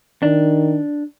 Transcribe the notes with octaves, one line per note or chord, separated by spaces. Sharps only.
D#3 D4